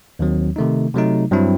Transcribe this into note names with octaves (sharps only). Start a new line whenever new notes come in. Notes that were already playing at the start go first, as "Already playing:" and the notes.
D#2 D#3 F#3 C4
C3 D#3 A3 D#4
C3 F#3 A3 D#4
G2 F#3 C4 E4